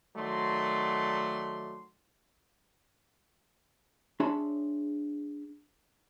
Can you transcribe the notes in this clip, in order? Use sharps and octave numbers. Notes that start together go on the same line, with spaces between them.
D#3 F#3 A3 D5 C6
D4 G#4 C#5 E5 B5 C6